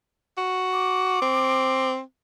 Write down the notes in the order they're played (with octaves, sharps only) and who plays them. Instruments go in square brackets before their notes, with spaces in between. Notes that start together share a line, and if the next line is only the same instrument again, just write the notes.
[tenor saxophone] F#4
[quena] D6
[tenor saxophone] C4